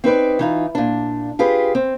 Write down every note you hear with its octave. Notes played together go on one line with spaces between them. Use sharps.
C4 D#4 B4 D5
E3 D#4 F4
A#2 D4
F4 G4 G#4 B4
C4